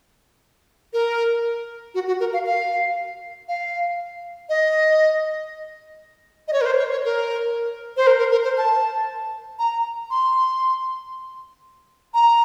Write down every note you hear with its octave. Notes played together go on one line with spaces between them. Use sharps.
A#4
F#4
F#4
A#4
F5
F5
F5
D#5
D#5
C#5
A#4
C5
C#5
C#5
A#4
C5
A#4
A#4
A#4
C5
A5
A#5
C6
A#5